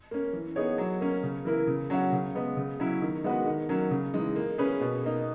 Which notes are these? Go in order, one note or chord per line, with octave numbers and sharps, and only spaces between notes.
A#3 C#4
E3
B3 D#4 G#4 C#5
F#3
A#3 C#4
C#3
E3 A#3 E4 A#4
C#3
F#3 C#4 F#4
C#3
G#3 B3
C#3
F#3 C#4 E4
D#3
G#3 B3 F#4 B4
D#3
F#3 A#3 C#4
C#3
E3 G#3 D#4
A#3
C#4 G#4 B4
B2
A#3 D#4